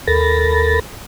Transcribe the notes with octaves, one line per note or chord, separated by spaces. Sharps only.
D#2 A4 A#4 B5 A6 A#6